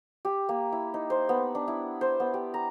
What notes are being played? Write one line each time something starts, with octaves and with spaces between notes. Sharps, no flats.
G4
A#3
E4
D#4
C5
B3
D4
E4
C5
B3
G4
A#5